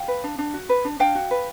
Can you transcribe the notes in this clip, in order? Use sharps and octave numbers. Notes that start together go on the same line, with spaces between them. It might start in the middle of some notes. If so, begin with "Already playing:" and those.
Already playing: F5 G5
B4
D4
D4
F#4
B4
D4
D4 F5 G5
F#4
B4